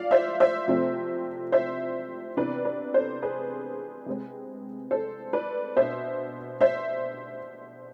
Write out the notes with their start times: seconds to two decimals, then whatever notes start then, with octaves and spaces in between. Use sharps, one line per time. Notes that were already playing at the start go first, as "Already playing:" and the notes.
Already playing: F3 D5 F5
0.11 C5 E5
0.40 C5 E5
0.68 C3 F3 A3 C4
1.52 C5 E5
2.37 C3 E3 B3 D4 B4 D5
2.65 B4 D5
2.94 A4 C5
3.22 G#4 B4
4.06 C3 G#3 C4
4.91 A4 C5
5.33 B4 D5
5.76 B2 B3 D4 C5 E5
6.61 C5 E5